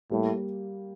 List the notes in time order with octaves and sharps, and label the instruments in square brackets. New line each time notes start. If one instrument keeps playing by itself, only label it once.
[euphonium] A2 [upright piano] G3 A#3